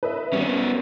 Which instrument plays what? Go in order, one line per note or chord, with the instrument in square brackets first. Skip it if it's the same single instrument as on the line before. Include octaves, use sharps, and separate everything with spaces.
[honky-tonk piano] B4 D#5 E5
[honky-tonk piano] G3 F#4 A#4 [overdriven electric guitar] B3 C#4